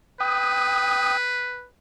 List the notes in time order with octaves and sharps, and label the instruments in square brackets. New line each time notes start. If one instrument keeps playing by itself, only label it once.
[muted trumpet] B4 [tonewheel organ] G5 D#6